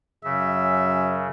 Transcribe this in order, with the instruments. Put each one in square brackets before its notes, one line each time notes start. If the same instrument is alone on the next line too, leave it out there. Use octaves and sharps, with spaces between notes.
[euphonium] F#2 [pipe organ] C#3 [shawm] E5